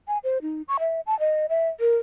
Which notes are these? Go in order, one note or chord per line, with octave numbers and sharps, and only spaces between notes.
G#5
C5
D#4
C#6
E5
A5
D#5
E5
A#4